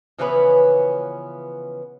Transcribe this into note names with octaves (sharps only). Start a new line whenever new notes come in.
C#3 E3 F3 B3 C#4 B4